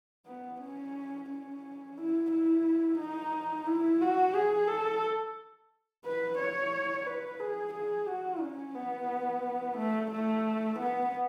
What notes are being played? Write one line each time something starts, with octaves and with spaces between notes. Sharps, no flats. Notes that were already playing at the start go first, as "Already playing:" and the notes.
B3
C#4
C#4
E4
E4
D#4
E4
F#4
G#4
A4
B4
C#5
B4
G#4
G#4
F#4
C#4
B3
A3
A3
B3